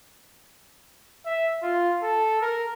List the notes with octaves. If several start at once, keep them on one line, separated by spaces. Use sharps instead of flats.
E5
F4
A4
A#4